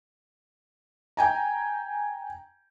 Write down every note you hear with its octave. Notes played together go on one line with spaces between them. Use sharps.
G5 G#5 A#5